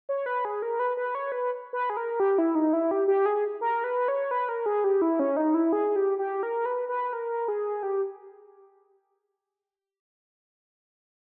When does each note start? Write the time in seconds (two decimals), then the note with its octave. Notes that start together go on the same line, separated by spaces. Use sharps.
0.09 C#5
0.26 B4
0.45 G#4
0.62 A#4
0.79 B4
0.97 B4
1.15 C#5
1.32 B4
1.73 B4
1.90 G#4
1.97 A#4
2.20 G4
2.38 E4
2.55 D#4
2.73 E4
2.91 G4
3.08 G4
3.26 G#4
3.61 A#4
3.84 B4
4.08 C#5
4.31 B4
4.49 A#4
4.66 G#4
4.84 G4
5.02 E4
5.20 C#4
5.37 D#4
5.54 E4
5.73 G#4
5.96 G4
6.19 G4
6.43 A#4
6.66 B4
6.89 B4
7.13 A#4
7.48 G#4
7.83 G4